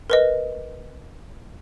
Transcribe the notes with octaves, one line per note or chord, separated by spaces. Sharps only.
A#4 B4 D#5